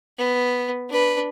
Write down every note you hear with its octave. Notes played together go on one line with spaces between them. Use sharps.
B3
D4 B4